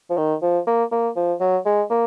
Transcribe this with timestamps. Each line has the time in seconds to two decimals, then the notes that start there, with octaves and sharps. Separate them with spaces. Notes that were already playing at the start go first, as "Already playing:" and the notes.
0.10 F3
0.18 D#3
0.42 F3
0.67 A#3
0.92 A#3
1.16 F3
1.40 F#3
1.66 G#3
1.90 A#3